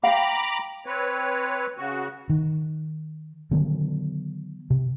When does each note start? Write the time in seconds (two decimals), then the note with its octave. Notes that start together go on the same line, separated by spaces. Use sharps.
0.03 F5 G5 A#5 B5 D6
0.86 C4 B4 C#5
1.78 C#3 F#4
2.30 D#3
3.51 D3 D#3 F#3 B3
4.70 C3